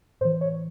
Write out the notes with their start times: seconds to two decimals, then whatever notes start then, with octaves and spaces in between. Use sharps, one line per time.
0.21 A2 C5
0.25 E3
0.41 C#5